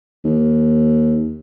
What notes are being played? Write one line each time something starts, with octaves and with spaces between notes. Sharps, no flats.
D#2